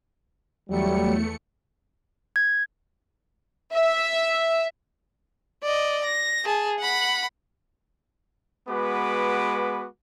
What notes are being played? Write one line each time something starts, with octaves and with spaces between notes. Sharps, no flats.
E2 F#3 G3 A3 C#7
G#6
E5
D5 D#5
A#6
G#4 A5
F#5 B5
G#3 B3 F#4 B4 D6